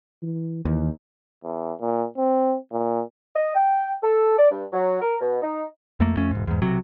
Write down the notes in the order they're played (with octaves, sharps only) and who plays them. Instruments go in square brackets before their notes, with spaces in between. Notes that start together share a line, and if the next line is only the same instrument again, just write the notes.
[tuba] E3
[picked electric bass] D#2 [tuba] E3
[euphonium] E2
A#2
C4
A#2
[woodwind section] D#5
G5
A4
D5
G2
F#3
A#4
B2
D#4
[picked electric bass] F2 A3 A#3
F2 A3 C#4
E1 G#2
E2 G#2
B1 C3 F#3